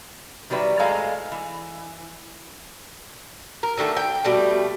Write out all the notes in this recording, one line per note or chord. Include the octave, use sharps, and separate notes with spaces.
D#3 F#3 G3 B4 E5
A2 G#3 A4 F5 G#5 A#5
E3
A#4
D3 D#3 A3 A4
G5
B2 G3 A3